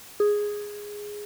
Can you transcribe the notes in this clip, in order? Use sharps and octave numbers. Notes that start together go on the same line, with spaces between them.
G#4